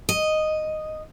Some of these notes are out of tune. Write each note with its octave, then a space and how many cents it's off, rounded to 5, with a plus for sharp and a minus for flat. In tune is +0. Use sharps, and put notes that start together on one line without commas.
D#5 -5